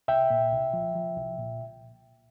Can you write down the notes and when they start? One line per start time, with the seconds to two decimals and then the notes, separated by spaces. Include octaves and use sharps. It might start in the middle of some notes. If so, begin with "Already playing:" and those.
0.08 C2 E5 G5
0.30 A#2
0.52 C2
0.73 F3
0.95 F3
1.17 C2
1.38 A#2